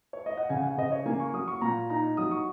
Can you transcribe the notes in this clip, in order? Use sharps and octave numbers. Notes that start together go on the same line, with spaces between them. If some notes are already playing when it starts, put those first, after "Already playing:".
C#5
D#5
F#5
C#3 G#5
F#5
C#3 D#5
C#5
A#3 G#5
C#6
F#3 D#6
C#6
A#2 A#5
D#4 A#5
F#3 D#6
C#6